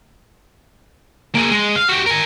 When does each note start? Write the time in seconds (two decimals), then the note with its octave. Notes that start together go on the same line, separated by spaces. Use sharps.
1.35 A#3 G#4
1.51 G#3
1.76 F5
1.89 F#4 G4
2.06 A#4 G#5